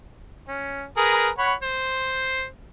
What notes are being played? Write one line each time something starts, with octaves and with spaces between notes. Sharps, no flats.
C#4
G#4 A#4 B4
C#5 F#5 B5
C5